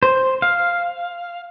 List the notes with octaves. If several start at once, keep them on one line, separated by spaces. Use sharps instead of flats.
C5
F5